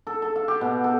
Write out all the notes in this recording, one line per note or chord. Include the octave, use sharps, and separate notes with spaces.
A4
A4
F5
G4
B2
A4